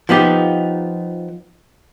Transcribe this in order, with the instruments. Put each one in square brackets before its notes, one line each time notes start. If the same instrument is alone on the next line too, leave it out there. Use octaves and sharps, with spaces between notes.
[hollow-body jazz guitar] F3 B3 D#4 G4